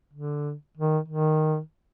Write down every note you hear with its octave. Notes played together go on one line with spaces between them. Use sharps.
D3
D#3
D#3